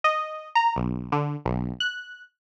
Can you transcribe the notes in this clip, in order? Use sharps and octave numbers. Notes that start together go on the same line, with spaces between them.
D#5
A#5
B1
D3
B1
F#6